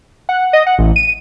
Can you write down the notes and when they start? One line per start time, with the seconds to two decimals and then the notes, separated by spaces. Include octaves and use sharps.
0.29 F#5
0.53 D#5
0.66 F#5
0.79 A1
0.96 D#7